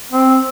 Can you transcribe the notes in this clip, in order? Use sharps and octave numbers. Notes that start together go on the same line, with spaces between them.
C4